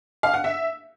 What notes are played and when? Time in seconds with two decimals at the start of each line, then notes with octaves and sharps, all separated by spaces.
0.23 F5
0.34 F#5
0.44 E5